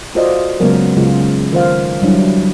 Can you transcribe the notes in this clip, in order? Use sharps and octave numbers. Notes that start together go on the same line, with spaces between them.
F4 F#4 C5 D5 D#5
C#3 F#3 G#3 A#3 B3 A#4
C#3 G#3 F4 G#4
D#3 F4 C5 F5
F#3 G3 D4 E4